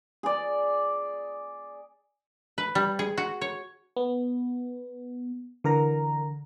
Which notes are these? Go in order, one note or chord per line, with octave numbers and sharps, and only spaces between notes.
G#4 D5
B4
G3
G#4
F#4
C#5
B3
D3 E3 A#4 A#5